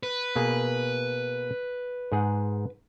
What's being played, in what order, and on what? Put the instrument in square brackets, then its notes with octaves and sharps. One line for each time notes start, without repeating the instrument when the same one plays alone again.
[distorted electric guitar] B4
[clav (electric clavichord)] B2 A#3 G#4
G#2 G#4 F#5